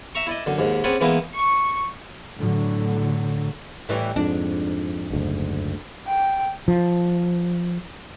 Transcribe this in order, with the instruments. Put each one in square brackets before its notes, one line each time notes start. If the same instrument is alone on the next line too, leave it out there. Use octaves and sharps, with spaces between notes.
[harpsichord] E5 A#5 C#6
E4 D5 D#5
F#2 D3
D#2 G#2
C4 C#4 G#4 B4 D5 F#5
E3 G#3 A#3 B3 D#4 E4
[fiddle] C#6
[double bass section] A2 D3 F#3
[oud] A2 E3 G3
[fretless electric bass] F2 G#2 [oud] D4
[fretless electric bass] F#1 D2 G#2
[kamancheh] G5
[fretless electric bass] F3